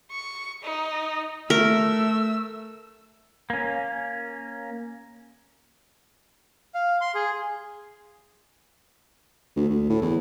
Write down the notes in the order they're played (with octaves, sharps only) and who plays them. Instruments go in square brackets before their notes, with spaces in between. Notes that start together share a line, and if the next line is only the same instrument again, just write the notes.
[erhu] C#6
D#4
[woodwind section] A3 [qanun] A#4 [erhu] E6
[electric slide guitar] A#3 C#4
[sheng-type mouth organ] F5
C6
G#4
[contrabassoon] D2
D2
A2
E2